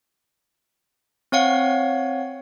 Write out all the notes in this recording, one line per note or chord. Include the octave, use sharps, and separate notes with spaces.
C4 C#5 F5 F#5